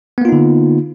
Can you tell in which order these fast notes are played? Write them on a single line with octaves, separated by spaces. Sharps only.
B3 A#3 F4 D#4 D3